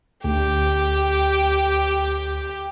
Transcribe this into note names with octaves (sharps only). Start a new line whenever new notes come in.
D2 G4